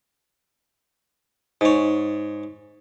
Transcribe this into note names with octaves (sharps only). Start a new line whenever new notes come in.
G#2 C#5